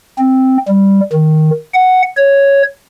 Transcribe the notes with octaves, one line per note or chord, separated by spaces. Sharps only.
C4
G3
D#3
F#5
C#5